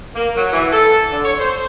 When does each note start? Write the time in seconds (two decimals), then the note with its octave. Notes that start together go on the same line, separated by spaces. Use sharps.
0.14 A#3
0.36 F#3
0.52 E3
0.72 A4
1.11 D3
1.24 C#5
1.38 C5